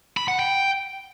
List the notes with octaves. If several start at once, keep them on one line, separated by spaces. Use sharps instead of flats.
B5
F#5
G5